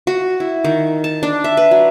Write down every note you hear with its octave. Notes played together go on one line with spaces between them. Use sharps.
F#4
E4
D#3
A5
D4
E5
B4
F#3